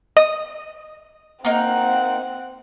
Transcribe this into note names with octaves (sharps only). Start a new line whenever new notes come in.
D#5 D#6
A#3 C4 D#4 F#5